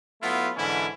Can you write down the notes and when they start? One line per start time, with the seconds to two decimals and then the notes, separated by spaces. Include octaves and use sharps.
0.22 F#3 A3 B3 E4 F4
0.56 G#2 D3 E3 C#4 E4